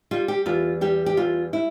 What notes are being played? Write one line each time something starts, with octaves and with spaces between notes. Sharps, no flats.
G3 F4
G4
E2 F4
G3 G4
G4
E2 F4
E4